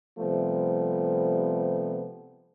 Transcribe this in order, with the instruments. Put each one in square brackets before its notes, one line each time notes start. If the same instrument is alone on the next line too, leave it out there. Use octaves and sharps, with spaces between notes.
[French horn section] C3 F3 G3 A3 B3